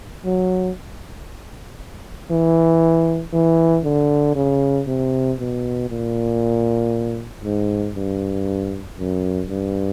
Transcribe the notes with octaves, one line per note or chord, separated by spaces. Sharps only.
F#3
E3
E3
D3
C#3
C3
B2
A#2
G#2
G2
F#2
G2